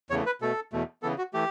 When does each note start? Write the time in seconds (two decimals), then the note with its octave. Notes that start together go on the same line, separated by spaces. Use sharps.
0.10 E2 C#3 E3 A3 C#5
0.26 B4
0.41 B2 A3 A4
0.72 E2 B2 A3
1.03 C#3 E3 B3 A4
1.18 F#4
1.33 E3 A3 G4